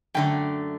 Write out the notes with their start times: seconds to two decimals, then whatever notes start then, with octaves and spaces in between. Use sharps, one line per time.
0.14 F#2 D3 A3 G5